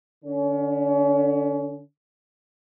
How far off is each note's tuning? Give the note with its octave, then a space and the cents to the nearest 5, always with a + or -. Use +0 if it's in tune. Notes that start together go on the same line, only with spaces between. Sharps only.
D3 +0 C#4 +35